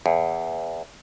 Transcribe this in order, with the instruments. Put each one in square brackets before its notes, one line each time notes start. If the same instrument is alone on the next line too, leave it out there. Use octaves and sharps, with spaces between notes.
[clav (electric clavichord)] E2